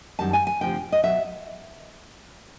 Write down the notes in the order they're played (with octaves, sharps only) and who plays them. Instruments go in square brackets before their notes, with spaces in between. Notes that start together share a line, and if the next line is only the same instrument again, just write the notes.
[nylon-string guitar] F#2 D#3 G3 A5
G#5
G#5
D2 C3 F3 G5
D#5
B2 F#3 B3 E5